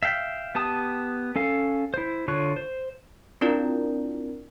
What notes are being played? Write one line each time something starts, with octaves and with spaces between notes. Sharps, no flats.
E5 F5 G5
B3 G4 A5 D#6
C#4 A4 F5
E4 C5
D3 F4 C#5 C#6 F#6
C5
C4 D4 E4 F4 A#4 D5